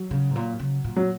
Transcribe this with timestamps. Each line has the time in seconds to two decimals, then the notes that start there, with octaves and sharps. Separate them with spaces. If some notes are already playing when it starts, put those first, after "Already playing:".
Already playing: F#3
0.11 C#3
0.31 G#2
0.35 A#2
0.60 C#3
0.84 A#2
0.96 F#3